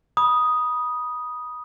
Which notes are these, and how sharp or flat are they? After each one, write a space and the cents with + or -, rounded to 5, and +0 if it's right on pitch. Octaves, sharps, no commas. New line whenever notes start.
B5 -25 D#6 +0